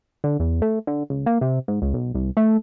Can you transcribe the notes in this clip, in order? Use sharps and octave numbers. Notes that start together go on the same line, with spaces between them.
D3
E2
A3
D3
C#2
A#3
C3
G#2
C#2
B1
C2
A3